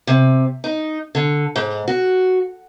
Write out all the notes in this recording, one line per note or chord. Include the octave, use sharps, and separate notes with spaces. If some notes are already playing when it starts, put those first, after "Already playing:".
C3
D#4
D3
G#2
F#4